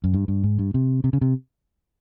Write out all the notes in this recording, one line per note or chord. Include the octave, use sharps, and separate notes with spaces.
F#2
G2
G2
G#2
G2
C3
C3
C#3
C3